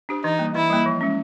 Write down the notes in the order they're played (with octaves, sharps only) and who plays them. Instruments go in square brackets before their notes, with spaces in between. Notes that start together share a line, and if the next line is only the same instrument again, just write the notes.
[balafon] D4 G4 C5
[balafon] E3 [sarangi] D#4
[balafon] G3 A#3
[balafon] E3 [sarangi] E4
[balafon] G3 A#3
F3
G#3 C#4